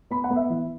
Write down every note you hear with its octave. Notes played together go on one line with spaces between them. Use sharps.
B3 B5
F#5
B3
E5
E3